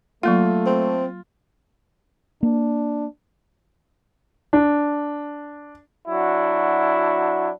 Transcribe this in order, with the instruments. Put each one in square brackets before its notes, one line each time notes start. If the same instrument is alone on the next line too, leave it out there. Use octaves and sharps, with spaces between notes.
[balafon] F#3 A#3 F#5 [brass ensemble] A3 [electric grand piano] F4
[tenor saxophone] C4
[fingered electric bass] A#3 [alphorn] D4
[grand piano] D4
[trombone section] F#3 D4 E4 F#4